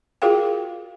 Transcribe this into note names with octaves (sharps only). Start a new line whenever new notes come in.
F4 F#4 G#4 A#4 F5 G5